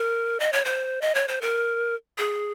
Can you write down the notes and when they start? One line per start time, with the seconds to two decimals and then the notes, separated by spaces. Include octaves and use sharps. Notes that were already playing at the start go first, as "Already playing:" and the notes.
Already playing: A#4
0.40 D#5
0.53 C#5
0.65 C5
1.02 D#5
1.15 C#5
1.28 C5
1.41 A#4
2.18 G#4